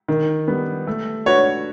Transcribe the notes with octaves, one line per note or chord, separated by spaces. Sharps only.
D#3
G3 B3
A3
D4 F#4 B4 C#5 D5